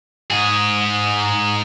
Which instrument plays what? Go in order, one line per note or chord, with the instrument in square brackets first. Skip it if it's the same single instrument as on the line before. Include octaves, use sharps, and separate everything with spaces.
[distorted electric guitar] G#2 G#4